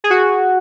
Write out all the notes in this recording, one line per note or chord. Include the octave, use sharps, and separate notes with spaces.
G#4
F#4